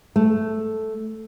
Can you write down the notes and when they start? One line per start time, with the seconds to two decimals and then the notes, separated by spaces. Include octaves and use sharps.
0.16 A3